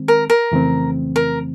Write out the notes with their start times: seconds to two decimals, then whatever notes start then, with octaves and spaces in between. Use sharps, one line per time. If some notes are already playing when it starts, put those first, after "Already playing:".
Already playing: D#3 G#3 C4
0.08 A#4
0.30 A#4
0.52 F2 C#3 E3 A3 C4
1.16 A#4